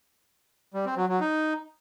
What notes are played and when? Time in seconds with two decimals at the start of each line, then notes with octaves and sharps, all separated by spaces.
0.74 G3
0.86 C4
0.97 F#3
1.09 F#3
1.20 D#4